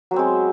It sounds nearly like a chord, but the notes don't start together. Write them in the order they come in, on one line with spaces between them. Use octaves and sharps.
F#3 B3 C4 G#3